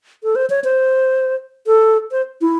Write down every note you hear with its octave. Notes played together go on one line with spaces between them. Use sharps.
A4
C5
C#5
C5
A4
C5
E4